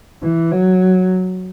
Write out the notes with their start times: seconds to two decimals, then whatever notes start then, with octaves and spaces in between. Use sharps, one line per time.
0.22 E3
0.51 F#3